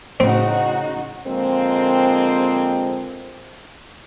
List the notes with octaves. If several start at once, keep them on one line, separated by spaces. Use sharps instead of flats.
A2 C#3 C4 D#4 F#4
D3 F3 G#3 A#3 C4